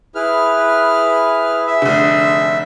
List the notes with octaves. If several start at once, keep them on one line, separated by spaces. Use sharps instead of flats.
E4 G#4 B4 F6
E5
F1 D3 G#4